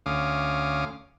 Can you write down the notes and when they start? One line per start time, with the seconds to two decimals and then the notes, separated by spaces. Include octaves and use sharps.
0.06 D2 C#4 F5 D6 D#6